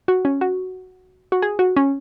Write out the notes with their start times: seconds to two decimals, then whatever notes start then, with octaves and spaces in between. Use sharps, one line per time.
0.08 F#4
0.25 C#4
0.41 F#4
1.32 F#4
1.42 G#4
1.59 F#4
1.76 C#4